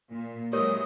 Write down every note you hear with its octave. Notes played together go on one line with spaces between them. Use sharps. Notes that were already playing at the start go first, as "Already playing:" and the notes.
A#2
E3 F#3 G#3 G4 A#4 C#5 D#6